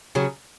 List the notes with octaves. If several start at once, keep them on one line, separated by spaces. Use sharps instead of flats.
C#3 F#3